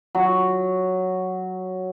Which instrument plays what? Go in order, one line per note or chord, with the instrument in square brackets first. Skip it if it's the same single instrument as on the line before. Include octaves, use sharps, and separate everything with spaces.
[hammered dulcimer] F#3